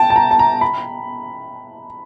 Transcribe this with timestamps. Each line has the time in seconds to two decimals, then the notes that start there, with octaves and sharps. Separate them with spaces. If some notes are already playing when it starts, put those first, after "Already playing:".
Already playing: G5 A5
0.10 A5
0.16 A#5
0.31 A5
0.39 A#5
0.61 B5